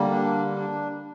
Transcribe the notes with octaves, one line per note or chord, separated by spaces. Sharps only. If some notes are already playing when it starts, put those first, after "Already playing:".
Already playing: D3 G3 A#3
D4
D4